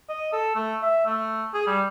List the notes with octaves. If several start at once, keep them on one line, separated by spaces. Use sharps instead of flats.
D#5
A4
A3
E5
A3
G#4
G3